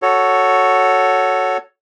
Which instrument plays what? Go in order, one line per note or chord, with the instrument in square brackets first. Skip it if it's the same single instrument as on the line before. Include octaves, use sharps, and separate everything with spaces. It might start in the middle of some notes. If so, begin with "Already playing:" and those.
[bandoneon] F#4 A4 C#5